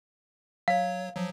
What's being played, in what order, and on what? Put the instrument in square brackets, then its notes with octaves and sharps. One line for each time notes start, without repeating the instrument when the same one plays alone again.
[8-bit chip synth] F#3 C#5 [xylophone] F5
[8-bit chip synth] F3 F#3